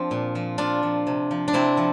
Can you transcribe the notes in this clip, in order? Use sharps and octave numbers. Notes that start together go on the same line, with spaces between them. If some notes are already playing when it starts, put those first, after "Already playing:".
Already playing: F3 C4 D4
A#2
F3
A#2 D4 F4
F3
C3
F3
D4
C3 C4 E4
F3